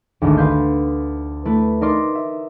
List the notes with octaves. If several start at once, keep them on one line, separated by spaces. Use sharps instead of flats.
G#1 D2
B4 F5 C6 G6
A3 E4 B4
D#4 A#4 D5 C6
E5